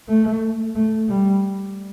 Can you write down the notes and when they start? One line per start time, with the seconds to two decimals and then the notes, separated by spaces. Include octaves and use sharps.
0.08 A3
0.75 A3
1.08 G3